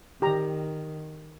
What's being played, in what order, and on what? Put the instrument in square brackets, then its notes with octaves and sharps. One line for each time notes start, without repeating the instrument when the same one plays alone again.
[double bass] D#3 [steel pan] G4 A#5